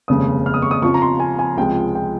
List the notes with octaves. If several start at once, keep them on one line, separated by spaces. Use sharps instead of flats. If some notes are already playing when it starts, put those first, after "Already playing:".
F1 D#2 C#3 G#3 D#6
F6
D#6
C#6
D#6
F2 C#3 F3 C#6
A#5
C6
G#5
G#5
C#2 C3 F3 G#3 G5
G5